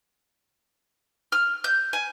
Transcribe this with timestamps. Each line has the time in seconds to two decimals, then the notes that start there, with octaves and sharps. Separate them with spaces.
1.32 F6
1.64 G6
1.93 G#5